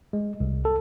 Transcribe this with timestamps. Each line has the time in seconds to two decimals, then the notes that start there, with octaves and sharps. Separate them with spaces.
0.13 G#3
0.40 C2
0.65 A4